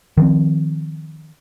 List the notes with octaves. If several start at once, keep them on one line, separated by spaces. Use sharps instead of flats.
D#3 F3 C4